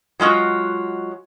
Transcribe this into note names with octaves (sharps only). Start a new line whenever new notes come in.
F#3 G#3 F4 F#4